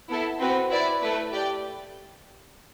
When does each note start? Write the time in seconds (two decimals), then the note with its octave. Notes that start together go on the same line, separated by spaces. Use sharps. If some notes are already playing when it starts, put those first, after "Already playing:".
0.10 B3 E4 A4
0.40 C4 F#4 B4
0.71 E4 B4 D5
1.02 A3 E4 B4
1.32 G4 D5 G5